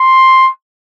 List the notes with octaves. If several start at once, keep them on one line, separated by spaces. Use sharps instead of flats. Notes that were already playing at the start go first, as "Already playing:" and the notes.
Already playing: C6